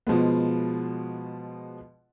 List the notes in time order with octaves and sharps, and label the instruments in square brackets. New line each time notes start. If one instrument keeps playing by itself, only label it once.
[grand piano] B2 F3 G#3 B3